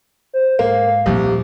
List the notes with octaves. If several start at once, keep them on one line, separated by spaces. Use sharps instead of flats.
C5
G#2 A#3 F5
D#1 C2 F3 G4